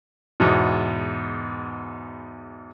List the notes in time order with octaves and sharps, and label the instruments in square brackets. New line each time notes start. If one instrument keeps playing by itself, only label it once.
[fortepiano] E2 G#2 B2